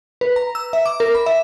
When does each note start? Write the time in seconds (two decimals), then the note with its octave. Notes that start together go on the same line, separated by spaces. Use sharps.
0.21 B4
0.36 A#5
0.55 E6
0.73 E5
0.86 D6
1.00 A#4
1.15 B5
1.26 E5